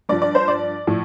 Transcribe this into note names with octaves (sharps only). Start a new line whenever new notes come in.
G2 F3 D5
D5
C5
D5
A2 F3